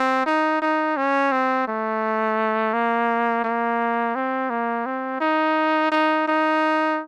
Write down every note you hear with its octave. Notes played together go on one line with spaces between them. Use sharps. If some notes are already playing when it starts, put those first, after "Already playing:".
Already playing: C4
D#4
D#4
C#4
C4
A3
A#3
A#3
C4
A#3
C4
D#4
D#4
D#4